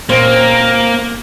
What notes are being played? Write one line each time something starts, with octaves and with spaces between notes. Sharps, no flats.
A#2 A#3 C4 C#4